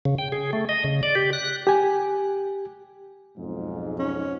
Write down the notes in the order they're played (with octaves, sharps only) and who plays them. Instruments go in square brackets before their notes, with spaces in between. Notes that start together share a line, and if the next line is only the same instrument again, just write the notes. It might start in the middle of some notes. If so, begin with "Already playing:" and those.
[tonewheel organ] C#3
G5
G#4
A3
D#5
C#3
D5
G4
F#6
[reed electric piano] G4 G#5
[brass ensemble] B1 F2 G#2
[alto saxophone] C#4